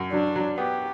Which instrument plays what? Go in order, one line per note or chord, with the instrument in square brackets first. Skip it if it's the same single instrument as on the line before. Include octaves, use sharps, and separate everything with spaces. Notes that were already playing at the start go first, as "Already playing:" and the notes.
Already playing: [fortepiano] F#2
[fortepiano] F#3 [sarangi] D4
[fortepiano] F#3
[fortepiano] B3 [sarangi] G4